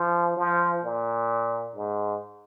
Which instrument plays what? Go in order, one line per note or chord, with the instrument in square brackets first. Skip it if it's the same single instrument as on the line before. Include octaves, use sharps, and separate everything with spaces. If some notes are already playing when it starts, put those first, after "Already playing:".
Already playing: [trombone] F3
F3
A#2
G#2